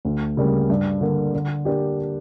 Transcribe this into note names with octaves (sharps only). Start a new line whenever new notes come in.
D2
C#3 G3 A#3
G2
D3 A#3
D3
A#3 D4 G4